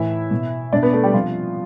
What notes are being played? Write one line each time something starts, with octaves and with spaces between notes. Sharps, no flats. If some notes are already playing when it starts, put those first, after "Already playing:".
Already playing: A2 E3 E4 E5
B2
B2 D4 D5
B3 B4
A3 A4
G3 G4
C3 F3 F4